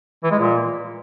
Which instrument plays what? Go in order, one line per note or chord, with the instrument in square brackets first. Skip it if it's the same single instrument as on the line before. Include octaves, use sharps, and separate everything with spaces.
[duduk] E3
G#3
A#2